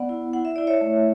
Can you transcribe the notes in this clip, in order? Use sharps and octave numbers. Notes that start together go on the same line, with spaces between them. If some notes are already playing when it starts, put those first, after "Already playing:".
Already playing: B3 D5 F#5
E4
E4 F#5
E5
E4 D5
C#5 E5
A3